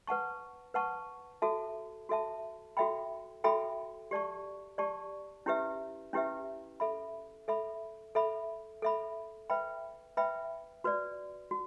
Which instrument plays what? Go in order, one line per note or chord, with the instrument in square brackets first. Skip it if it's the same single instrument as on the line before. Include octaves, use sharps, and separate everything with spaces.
[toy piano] B4 F#5 A5 C#6
B4 F#5 A5 C#6
F#4 A4 E5 A5
F#4 A4 E5 A5
F#4 A4 E5 G5 B5
F#4 A4 E5 G5 B5
G4 D5 A5 C#6
G4 D5 A5 C#6
C#4 E4 G4 B4 E5
C#4 E4 G4 B4 E5
A4 E5 B5
A4 E5 B5
A4 E5 B5
A4 E5 B5
B4 E5 G5 B5
B4 E5 G5 B5
F#4 B4 D5
F#4